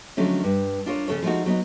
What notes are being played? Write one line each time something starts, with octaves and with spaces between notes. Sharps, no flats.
D3 F3 F#3 G#3 A3 C#4
G2
D4 F4 A#4 C#5
F2 C#3 F3 A4 C#5
F3 G#3 A3 D4 D#4 F#4
F#3 B3 C#4 D#4